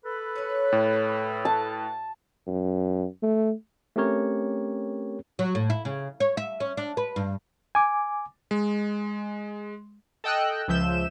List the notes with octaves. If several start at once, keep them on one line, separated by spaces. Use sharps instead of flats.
A4 B4
C#4 C#5
A2
A5
F#2
A3
A3 C4 C#4 G4 A#4 C#5
F#3
A2
E4
C#3
C#5
E5
C#4
D4
B4
G2
G#5 D6
G#3
A4 D#5 G5 E6 F#6
C#2 F3 E5 G6 E7